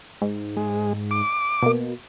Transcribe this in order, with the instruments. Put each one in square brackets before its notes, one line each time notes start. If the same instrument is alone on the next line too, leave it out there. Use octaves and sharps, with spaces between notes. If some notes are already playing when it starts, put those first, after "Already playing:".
[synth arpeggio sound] G#2
[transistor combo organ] G#3
D6
[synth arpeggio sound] B2 A#3